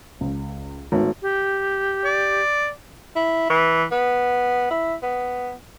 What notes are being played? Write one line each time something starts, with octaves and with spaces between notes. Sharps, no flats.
C#2
G#1 A3 B3 C#5
G4
D5
E4
E3
B3
E4
B3